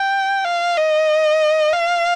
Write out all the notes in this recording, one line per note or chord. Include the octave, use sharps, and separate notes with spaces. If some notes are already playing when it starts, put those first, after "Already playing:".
Already playing: G5
F5
D#5
F5